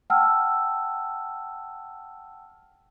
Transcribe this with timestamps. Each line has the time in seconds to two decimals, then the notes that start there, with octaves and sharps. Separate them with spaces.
0.10 F#5 G5 A5 E6 F6